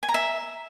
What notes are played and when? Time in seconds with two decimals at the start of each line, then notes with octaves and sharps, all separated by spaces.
0.03 G#5
0.09 A#5
0.14 E5